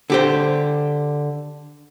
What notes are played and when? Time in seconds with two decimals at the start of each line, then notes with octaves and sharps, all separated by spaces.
0.10 D3 G4 C5